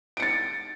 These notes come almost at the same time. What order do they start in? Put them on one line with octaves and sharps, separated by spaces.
D7 C#7 A6